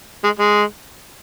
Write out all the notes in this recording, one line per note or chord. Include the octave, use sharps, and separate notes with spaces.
G#3
G#3